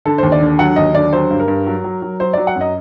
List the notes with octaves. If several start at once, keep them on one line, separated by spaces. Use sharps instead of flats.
D3 A4
D#2 C5
D5
D3
F#3 F#5
D#2 D#5
D3 D5
F#3 C5
G2
A#4
G2
F#3
F#3
F#3
F#3 C5
F#3 D5
F#5
F#2
D#5